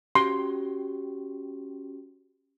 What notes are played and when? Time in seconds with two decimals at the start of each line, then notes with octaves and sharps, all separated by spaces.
0.15 C#4 F#4 G4 C6